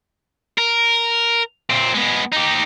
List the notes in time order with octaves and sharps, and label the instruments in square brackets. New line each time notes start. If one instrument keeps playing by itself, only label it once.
[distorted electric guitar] A#4
A#2 C4
G#3 B3
D#4 G4